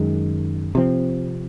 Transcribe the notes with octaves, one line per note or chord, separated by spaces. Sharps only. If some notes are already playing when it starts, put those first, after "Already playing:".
Already playing: F#2 D#3 G#3
C3 F3 C4